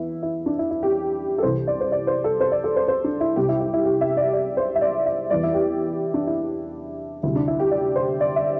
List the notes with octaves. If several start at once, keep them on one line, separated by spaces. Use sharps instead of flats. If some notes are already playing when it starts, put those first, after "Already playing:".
Already playing: E2 E3 E4
E4
D4
E4
E4
G4
A4
C2 C3 E3 C5
D5
C5
D5
C5
A4
C5
D5
A4
C5
C5
D4
E4
C2 C3 G3 G4
E4
E4
E4
G4
E5
D5
D5
C5
E5
D5
E5
E2 E3 G3 D5
E4
G4
D4
E4
D2 C3 G3 E4
D4
E4
G4
D5
C5
D5
E5